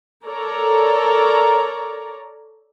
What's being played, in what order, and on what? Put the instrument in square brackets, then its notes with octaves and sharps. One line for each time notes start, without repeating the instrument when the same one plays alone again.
[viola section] A4 A#4 C#5 D5 A#5